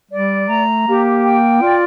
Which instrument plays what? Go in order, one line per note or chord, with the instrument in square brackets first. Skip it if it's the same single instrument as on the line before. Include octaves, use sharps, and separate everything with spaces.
[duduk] G3 [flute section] D5
[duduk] A3 [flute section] A#5
[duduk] A#3 [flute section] G4
[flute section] G5
[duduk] F4 [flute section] D5